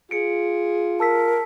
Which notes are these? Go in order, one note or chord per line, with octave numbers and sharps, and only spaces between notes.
F4 G#4 C#7 D7
A#4 A5 E6 B6